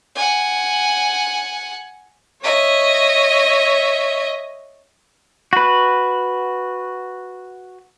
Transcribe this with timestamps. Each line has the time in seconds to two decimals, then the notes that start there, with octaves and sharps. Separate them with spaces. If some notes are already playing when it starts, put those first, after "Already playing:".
0.15 F#5 G#5
2.41 C#5 D#5 E5
5.53 F#4 B4